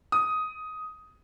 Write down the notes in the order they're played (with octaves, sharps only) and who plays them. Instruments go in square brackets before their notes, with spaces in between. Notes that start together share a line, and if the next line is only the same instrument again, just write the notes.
[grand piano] D#6